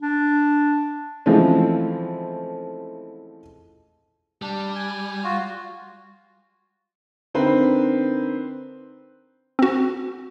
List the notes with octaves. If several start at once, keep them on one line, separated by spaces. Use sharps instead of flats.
D4
C#3 E3 F3 G#3 A3 C4
G3 D4
G#5
F4 F#4
D3 C4 D#4 A#4 B4
C4 F#4